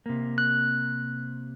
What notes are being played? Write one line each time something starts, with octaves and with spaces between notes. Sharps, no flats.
C3 A#3
F#6